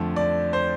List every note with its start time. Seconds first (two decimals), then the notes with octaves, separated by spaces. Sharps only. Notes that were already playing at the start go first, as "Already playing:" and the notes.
Already playing: F2 D3 F3 A3
0.16 D5
0.53 C5